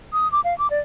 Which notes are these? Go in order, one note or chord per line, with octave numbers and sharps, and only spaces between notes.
D#6
D6
F5
D6
D5